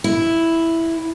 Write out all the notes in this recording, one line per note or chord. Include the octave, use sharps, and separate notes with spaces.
E4